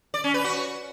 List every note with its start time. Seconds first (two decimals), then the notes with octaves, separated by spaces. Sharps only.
0.14 D5
0.24 C#4
0.34 B4
0.44 F#4